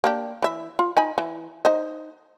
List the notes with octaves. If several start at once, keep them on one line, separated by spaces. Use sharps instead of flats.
A#3 D4 G4
E3 E5
F4
D#4 G#5 B5
E3
D#4 C5 D#5